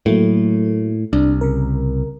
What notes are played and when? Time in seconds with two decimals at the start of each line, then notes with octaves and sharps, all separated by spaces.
0.06 A2 F#3 A3 A#3
1.13 C2 D4
1.41 C#3 A#4